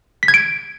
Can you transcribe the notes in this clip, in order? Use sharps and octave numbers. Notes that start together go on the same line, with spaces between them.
B6
G#6
D7